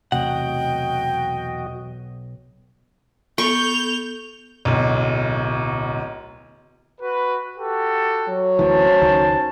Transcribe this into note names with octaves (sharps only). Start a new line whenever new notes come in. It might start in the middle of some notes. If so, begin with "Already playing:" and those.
B1 E2 C3 A3 F#4 D#5 F#5 G5
B3 A4 C#6 G6 F7
D1 B1
F#4 B4
F#4 G4 A4
F#3
D2 E3 C#4 C5 A5
C#2 D#3